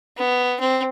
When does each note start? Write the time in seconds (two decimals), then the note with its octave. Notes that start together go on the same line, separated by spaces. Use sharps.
0.17 B3
0.60 C4